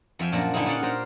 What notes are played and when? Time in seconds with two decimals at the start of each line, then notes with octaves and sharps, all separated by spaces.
0.19 F2 F3 E5 F5 G5 G#5
0.32 F#2 A#2 F3 A#3 D4
0.54 D3 D#4 E4 G4 G#4
0.66 C#4 D#4 D5 F5 F#5
0.83 G4 A#4 C5 D5